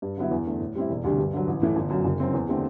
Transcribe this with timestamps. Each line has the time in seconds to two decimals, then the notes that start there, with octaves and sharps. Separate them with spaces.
0.02 G2
0.17 D3 F#3 B3 E4
0.31 E2
0.46 D3 A3
0.60 A2
0.75 G3 C4 E4
0.89 E1
1.04 D2 C3 G3 D4
1.19 G2
1.33 D3 F#3
1.47 A1
1.62 A2 E3 A3
1.76 G1
1.90 F#2 F#3
2.05 F#1
2.20 F#2 F#3 C4
2.34 E2
2.48 D3 A3 C4 G4